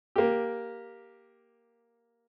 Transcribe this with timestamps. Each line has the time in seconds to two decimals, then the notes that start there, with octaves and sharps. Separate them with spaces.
0.16 A#3 G4